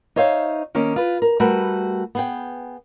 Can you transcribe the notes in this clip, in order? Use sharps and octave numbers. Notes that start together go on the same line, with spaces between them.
D#4 C5 C#5 E5 F5
D#3 A#3 C#4
F4 B4
A#4
G3 A3 F#4 A#4 B4
B3 G#4 G5